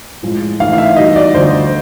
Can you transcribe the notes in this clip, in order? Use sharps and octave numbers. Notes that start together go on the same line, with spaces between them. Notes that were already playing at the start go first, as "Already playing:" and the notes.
A2 F3 G#3
G#2 E3 A3 F5
F5
E5
E3 G3 B3 D#4 F#4 D#5
D5
D2 D3 F3 C5